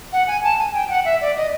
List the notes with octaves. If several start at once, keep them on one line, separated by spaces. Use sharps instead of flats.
F#5
G#5
A5
G#5
G5
F#5
E5
D5
D#5